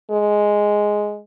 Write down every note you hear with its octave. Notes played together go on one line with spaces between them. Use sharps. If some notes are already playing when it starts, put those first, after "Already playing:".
G#3